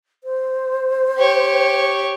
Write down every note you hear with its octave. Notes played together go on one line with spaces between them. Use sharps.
C5
G4 C#5